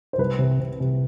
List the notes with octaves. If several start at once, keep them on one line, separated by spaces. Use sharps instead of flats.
C5
C2 B4
C3
C3
C3